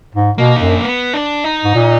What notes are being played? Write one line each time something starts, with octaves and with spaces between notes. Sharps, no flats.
G#2
B2 A#3
F#2 D#4
D4
B3
D4
D#4
G#2
A#2